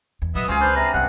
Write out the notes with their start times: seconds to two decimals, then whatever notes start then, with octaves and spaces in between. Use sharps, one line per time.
0.22 E2
0.35 A#1 F#3 B3 D#5 E5
0.48 C#2 C4 C#4 F4 G#4
0.61 D4 B4 C5 F6
0.76 C3 A#5
0.94 C2 G2 C#3 F#5